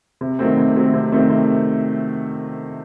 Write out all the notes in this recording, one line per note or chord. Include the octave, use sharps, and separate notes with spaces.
C3
D#3 F#3 A3 C4
C3
D#3 F#3 A3 C4
C3
D#3 F#3 A3 C4
C3